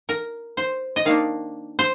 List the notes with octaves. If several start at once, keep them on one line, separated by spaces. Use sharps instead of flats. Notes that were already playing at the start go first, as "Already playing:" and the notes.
A#4
C5
D#5
D#3 A#3 D4 F5
C5